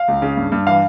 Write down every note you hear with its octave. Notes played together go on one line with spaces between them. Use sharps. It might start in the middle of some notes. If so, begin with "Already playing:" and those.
Already playing: F5
C#2
C#3
G2
G2
E3 F5